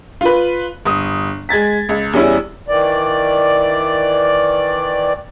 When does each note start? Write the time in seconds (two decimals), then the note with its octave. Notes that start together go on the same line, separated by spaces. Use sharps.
0.21 F4 B4
0.85 G1 D#6
1.49 G#3 G#6 A6 B6
1.89 C#2
2.13 E2 G3 C#4 E4
2.68 D#3 E3 D5